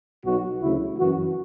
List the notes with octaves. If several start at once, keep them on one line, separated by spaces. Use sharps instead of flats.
B1 B2 F#3 F#4
D2 C#3 F#3 E4
F#2 E3 F#4